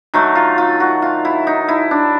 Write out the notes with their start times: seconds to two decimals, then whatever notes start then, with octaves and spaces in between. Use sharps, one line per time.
0.14 D#3 F#3 A3 A#4
0.35 F4
0.58 F4
0.80 F#4
1.02 F4
1.25 E4
1.47 D#4
1.68 E4
1.91 D4